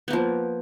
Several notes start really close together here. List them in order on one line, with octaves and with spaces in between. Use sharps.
B3 A#3 F3